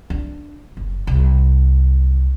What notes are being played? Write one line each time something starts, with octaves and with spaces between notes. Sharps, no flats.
D4
F#1
C2